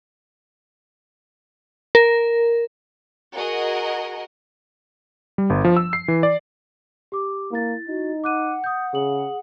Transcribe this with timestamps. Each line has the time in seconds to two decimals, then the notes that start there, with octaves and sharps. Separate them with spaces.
1.95 A#4
3.37 F#4 G#4 A#4 D#5 F#5
5.38 G3
5.50 G1
5.65 F3
5.77 E6
5.93 C7
6.08 E3
6.23 D5
7.12 G4 D6
7.51 A#3 E4 A6
7.88 D#4 F#4
8.24 F#5 D6 F#6 D#7
8.64 D#6 G6
8.93 C#3 G#4 D#6 F#7